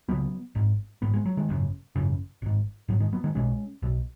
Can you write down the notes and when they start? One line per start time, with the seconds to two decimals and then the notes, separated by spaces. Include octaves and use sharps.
0.09 C#2 C#3 F#3 B3
0.55 G#1 G#2
1.02 G#1 G#2 B3
1.14 G#3
1.25 F#3
1.37 D#3 G#3
1.49 G#1 F#2 C#3
1.96 G#1 F#2 C#3
2.42 G#1 G#2
2.88 G#1 G#2 F#3
3.00 D#3 G#3
3.13 F#3 B3
3.24 D#3 G#3
3.35 B1 B2 G#3 C#4
3.82 B1 B2